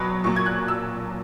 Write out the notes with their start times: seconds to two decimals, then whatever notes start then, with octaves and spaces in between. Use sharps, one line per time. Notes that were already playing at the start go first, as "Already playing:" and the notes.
Already playing: B2 F#3 B5 F#6
0.24 A#2 F#3 C#6
0.36 G#6
0.46 F#6
0.68 E6